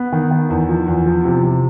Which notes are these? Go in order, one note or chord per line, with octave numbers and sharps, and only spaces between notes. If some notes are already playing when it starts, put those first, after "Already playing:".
Already playing: B3
D#3
D#3
E2
F3
E2
F3
C3
C3